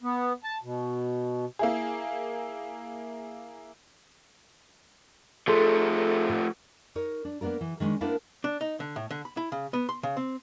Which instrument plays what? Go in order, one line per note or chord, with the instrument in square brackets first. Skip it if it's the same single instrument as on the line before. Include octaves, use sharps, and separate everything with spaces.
[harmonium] B3
A5
B2
[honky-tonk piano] A#3 E4 G#4
[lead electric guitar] F3 A3 [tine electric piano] G#4 A4 C6
[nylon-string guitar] D#4 A#4 C#5
D4
A#3 B3 D4 F4 A#4
E3
D#3 G#3 C#4 D4
A#3 B3 D4 E4 A#4 C5
[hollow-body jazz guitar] D4
D#4
D3
A2
D3
B5
E4
C#3
B3
C6
C#3
C4